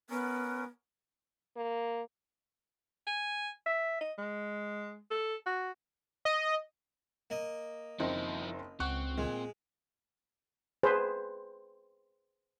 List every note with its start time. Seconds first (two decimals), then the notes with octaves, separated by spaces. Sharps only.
0.10 B3 C#4 A#4
1.57 A#3
3.07 G#5
3.66 E5
4.01 D#5
4.18 G#3
5.11 A4
5.46 F#4
6.25 D#5
7.30 A#3 D#5
8.00 F#1 F3 C4 D#4 E4
8.80 C#2 C4 F#5 C#6 F#6
9.18 A#2 G#3
10.83 G#4 B4 C5